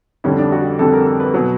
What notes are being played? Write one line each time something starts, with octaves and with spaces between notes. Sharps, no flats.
F2 D3 G3 C#4
D4
F#4
F2 D3 G3 A4
A#4
A4
B4
B2 F#3